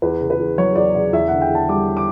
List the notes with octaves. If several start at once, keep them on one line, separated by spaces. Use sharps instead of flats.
E2 B4
C#3
B4
E2
F#3 C#5
E2 D5
C#3 D5
E2 E5
D3 F#5
G5
E2 A5
G3 D6
D6